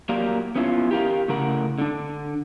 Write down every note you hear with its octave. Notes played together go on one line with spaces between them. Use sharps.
F#3 A#3 G4 A#4 D5 F5
B3 C#4 E4 F4
G4 A#4 F5
A2 C#3 A#4 F#5
D3 D4